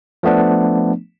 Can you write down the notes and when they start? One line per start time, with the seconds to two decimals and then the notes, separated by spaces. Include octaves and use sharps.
0.23 F3 A3 B3 D4